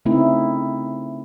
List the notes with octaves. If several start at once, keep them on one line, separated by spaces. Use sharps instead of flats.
C#3 A3 C4 D#4 E4